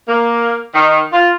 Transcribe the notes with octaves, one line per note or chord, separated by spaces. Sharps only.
A#3
D#3
F4